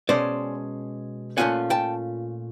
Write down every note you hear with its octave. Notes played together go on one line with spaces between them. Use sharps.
B2 G#3 C#4 C5 D5
A#2 F3 A3 C#4 F4 F#5 G#5
G5 A5